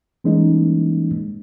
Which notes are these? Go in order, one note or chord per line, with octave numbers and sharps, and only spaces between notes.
E3 G3 G#3 A#3 C#4 D#4